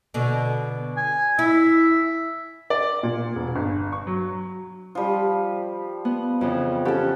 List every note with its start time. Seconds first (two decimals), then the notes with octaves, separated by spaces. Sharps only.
0.14 B2 D3
0.97 G#5
1.39 E4 E5
2.70 D5
3.03 A#2
3.36 E1
3.56 G1
3.92 C#6
4.07 F#3
4.95 F3 G3
6.05 B3
6.41 F2 C#3 E3
6.85 C#4 F#4 G4 A4